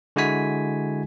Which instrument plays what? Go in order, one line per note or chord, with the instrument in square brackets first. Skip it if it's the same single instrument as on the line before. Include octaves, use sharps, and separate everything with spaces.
[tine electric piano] D3 G#3 E4 F#4 G#5 B6